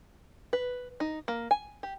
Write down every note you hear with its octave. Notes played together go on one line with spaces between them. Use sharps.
B4
D#4
A#3
G#5
G4